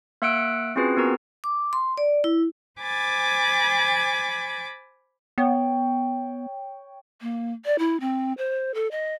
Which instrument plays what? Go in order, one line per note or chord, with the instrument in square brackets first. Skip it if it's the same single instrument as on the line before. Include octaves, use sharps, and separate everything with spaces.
[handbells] A#3 E5 F#5 E6 F#6 D7
C4 C#4 F4 F#4 G#4 B4
B3 C4 F#4 A#4 A#5
[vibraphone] D6
C6
D5
E4
[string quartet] C5 G#5 B5 D6 A6
[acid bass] B3 [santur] C#5 G5
[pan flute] A#3
D5
E4
C4
C5
A4
D#5